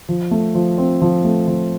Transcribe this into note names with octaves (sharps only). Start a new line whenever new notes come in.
F3
A3
F3
C4
F3
A3
F3